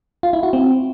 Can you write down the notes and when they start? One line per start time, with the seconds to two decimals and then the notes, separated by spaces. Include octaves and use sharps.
0.23 F4
0.33 E4
0.43 F#4
0.53 C4